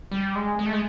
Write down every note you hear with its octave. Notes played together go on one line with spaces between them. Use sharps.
G3
G#3
G#3
A3
G#3